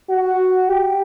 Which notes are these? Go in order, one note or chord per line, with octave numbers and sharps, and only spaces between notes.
F#4
G4